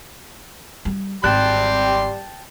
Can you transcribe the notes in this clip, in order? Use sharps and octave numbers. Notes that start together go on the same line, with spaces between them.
G3
G#1 G3 G4 G5 A5 C6 F#6